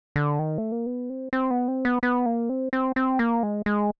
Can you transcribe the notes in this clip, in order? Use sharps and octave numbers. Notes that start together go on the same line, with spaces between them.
D3
D#3
A3
A#3
B3
C4
C4
B3
C4
B3
B3
A#3
C4
C4
C4
A#3
G#3
G#3